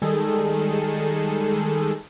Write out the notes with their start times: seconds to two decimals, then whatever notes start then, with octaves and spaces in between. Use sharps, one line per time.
0.02 D#3 G3 G#3 G#4 A4